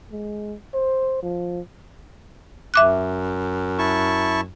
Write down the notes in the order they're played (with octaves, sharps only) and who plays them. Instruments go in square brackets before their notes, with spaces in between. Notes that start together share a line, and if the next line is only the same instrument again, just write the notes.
[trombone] G#3
C5
F3
[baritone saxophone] F#2 [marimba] E5 D6 F#6
[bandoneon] E4 A5 C#6